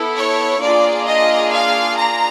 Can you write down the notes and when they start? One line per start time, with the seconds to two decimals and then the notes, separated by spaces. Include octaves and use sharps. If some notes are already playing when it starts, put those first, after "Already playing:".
Already playing: B3 E4 A4
0.16 C#5
0.61 A#3 D4 F4 G#4 D5
1.06 D#5
1.51 F5
1.96 A#5